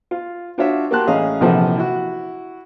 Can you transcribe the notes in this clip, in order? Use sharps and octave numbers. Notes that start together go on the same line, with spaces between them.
F4
D4 F4 F#4 C#5 E5
A#3 F#4 G4 A5 C6 F#6
A1 C#4 G#4 D#5 F5
A#1 C3 E3 F3 A4 F#5
E4 F#4